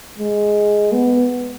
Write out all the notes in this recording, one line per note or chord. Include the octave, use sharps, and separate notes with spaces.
G#3
B3